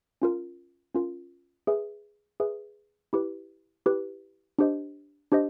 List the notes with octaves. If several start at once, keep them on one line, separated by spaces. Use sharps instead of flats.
C#4 F4 A#4
C#4 F4 A#4
G#4 B4 E5
G#4 B4 E5
E4 G4 B4
E4 G4 B4
D4 G4 C5 D#5
D4 G4 C5 D#5